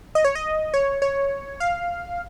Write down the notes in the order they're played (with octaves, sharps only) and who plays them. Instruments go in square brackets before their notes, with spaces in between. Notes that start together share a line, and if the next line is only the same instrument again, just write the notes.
[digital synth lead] D#5
C#5
D#5
C#5
C#5
F5